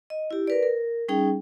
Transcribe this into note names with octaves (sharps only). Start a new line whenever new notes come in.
D#5
E4 G4
A#4 B4 D5
A#4
G3 C#4 D#4 G#4 G5